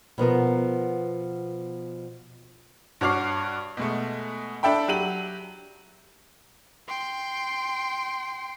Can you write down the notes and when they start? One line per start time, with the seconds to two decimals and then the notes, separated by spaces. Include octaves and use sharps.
0.18 B2 F3 B3 A#4
3.01 G2 F#4 C#5 D6 F6 C7
3.77 B2 G#3 A3
4.63 D4 A4 E5 G5 B5
4.88 F#3 G4 D#7 F#7
6.88 G5 C6